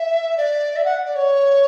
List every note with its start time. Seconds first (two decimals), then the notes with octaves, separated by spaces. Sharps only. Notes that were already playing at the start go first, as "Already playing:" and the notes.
Already playing: E5
0.37 D5
0.75 E5
0.84 F#5
1.05 D5
1.15 C#5